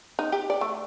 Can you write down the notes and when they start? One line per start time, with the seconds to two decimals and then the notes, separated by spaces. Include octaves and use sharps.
0.19 D#4
0.32 G4
0.50 D5
0.61 A3